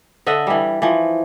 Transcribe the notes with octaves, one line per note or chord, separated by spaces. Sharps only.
D3 D#5 E5 F#5
E3 G3
E3 F3